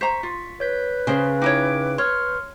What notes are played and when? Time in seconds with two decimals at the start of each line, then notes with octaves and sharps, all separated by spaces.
0.01 C5 A#5 C#6 B6
0.23 F4
0.60 B4 C#5 G6 B6
1.07 C#3 G#4 A#4 C5
1.42 D#4 E4 C#5 G5 D6 D7
1.98 C#5 C6 C#6 F6